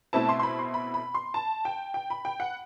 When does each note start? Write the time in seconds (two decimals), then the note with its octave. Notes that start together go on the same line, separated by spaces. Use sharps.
0.13 B2 A3 C4 E4 A5
0.29 C6
0.39 C6
0.43 B5
0.59 C6
0.74 B5
0.94 B5
1.14 C6
1.34 A5
1.65 G5
1.94 G5
2.10 B5
2.25 G5
2.40 F#5